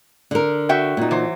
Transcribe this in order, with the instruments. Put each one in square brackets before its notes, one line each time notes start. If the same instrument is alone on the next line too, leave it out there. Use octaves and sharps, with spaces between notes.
[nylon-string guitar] D3 A#4
[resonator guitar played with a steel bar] F#4 E5 G5
[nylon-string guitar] A#2 D#4
[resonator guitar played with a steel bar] E3 F#3 C5